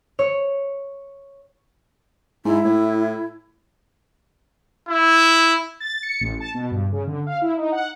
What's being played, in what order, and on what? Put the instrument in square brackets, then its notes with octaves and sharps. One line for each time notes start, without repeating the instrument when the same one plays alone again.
[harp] C#5
[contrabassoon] G#2 [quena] E4
[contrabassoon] A2
[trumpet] E4
[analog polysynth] A6
C#7
A1
A5
B2
G2
C#3
D3
F5
E4
D#4
F#5